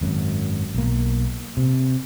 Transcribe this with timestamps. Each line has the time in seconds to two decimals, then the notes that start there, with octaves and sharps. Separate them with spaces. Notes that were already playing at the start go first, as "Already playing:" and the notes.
0.01 G#1 F#2
0.75 B1 A#3
1.57 C3